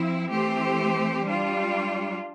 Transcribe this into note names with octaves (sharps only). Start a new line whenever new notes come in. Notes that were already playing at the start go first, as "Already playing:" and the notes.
Already playing: F3 C4 E4
E3 A3 C4 G4 C5
G3 D4 F4